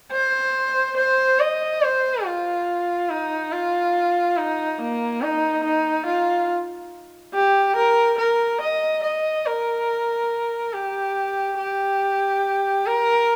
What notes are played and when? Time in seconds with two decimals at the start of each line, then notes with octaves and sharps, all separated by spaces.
0.13 C5
0.97 C5
1.40 D#5
1.83 C5
2.25 F4
3.10 D#4
3.53 F4
4.37 D#4
4.79 A#3
5.22 D#4
5.64 D#4
6.06 F4
7.35 G4
7.77 A#4
8.19 A#4
8.61 D#5
9.04 D#5
9.46 A#4
10.74 G4
11.58 G4
12.86 A#4